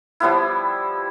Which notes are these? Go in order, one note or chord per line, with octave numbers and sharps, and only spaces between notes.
F3 G3 B3 E4